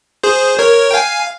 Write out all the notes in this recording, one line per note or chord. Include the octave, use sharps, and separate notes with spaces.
G#4 C5
A#4 C#5
G5
F5 G#5